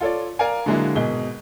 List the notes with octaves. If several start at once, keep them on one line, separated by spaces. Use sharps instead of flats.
F4 A4 C#5 D5
A#4 D5 F5 G#5
D3 F#3 G#3 A#3 E4
G#1 B2 G#4 D#5 G7